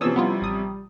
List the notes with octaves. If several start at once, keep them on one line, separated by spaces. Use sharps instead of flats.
C3 E3 F3 C#4 D#6 E6
G3 B3 E4 F4
A1 D#6